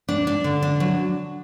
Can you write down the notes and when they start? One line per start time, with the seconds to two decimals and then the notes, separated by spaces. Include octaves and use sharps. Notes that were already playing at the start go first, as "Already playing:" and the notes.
0.09 D4
0.27 D4
0.44 D3
0.63 D4
0.80 F#3